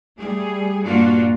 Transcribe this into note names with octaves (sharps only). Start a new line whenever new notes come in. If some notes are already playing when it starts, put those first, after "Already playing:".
G3 A3 G#4
G2 A#2 A#3 D4 F4 F#4